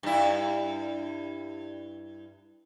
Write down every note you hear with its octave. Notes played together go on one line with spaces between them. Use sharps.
G2 E4